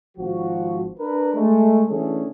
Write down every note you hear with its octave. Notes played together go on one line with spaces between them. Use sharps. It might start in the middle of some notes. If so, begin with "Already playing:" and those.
G#1 F3 F#4
D4 A#4 B4
G#3 A3
D3 E3 A3 C#4 G#4 A4